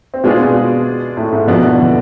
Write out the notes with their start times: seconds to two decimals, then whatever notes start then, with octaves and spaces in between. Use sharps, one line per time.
0.14 C4
0.24 B2 G#3 B3 D4 F4 G#4
0.39 B2 B3
1.17 A2 A3
1.32 G#2 G#3
1.48 F2 B2 F3 B3 D4
1.64 E2 E3
1.79 D3